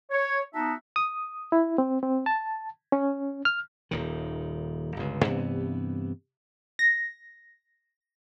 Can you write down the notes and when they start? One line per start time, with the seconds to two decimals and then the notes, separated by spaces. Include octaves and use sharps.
0.11 C#5
0.55 B3 D#4 F#4 E5 A5
0.96 D#6
1.52 E4
1.78 C4
2.03 C4
2.26 A5
2.92 C#4
3.45 F6
3.91 D#1 D#2 D#3
4.96 G1 C#2
5.25 G2 C3 E3 B3
6.79 A#6